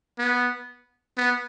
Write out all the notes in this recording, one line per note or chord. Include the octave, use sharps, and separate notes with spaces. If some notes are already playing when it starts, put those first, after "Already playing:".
B3
B3